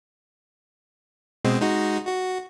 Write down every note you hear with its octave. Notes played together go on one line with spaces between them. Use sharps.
B2 G#3 C4
G#3 D#4 F#4
F#4